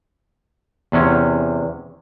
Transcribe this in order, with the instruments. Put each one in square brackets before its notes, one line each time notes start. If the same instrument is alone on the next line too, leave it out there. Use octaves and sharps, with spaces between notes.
[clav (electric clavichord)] E2 C3 C#4